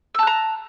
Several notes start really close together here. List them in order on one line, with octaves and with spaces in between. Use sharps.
E6 A5 F#6 A#5